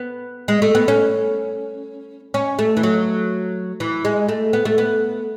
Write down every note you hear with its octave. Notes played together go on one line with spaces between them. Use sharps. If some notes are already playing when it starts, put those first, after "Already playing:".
Already playing: B3
G#3
A3
B3
C#4
C#4
A3
E3
F#3
E3
G#3
A3
B3
A3
B3